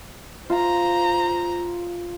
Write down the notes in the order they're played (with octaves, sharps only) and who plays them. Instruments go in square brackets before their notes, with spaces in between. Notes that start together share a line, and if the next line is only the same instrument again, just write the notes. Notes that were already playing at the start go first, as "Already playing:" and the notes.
[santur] F4 [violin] C5 A#5